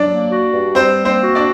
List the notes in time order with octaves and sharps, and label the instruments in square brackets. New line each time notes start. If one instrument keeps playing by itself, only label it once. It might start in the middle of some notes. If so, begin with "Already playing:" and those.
Already playing: [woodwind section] F#3 [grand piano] D4 D5
[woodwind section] A#3
F#4
G2
[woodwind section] G3 [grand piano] C4 C5
[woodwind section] A#3
[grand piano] C4 C5
[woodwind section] F#4
[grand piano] D4 D5